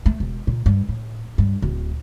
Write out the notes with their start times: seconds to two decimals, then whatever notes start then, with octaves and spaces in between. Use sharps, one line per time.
0.06 A3
0.20 E1
0.47 A#2
0.66 G2
0.89 A2
1.38 G2
1.62 D1